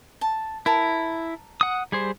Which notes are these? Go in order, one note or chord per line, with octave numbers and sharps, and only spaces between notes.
A5
E4 A#4 A5
F#5 D#6
G3 G#4 C5